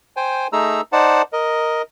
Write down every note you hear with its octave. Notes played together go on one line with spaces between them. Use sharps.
C5 G5 G#5
A3 D#4 G#4 A#5 E6
D#4 C5 D5 F#5 A5
A#4 D#5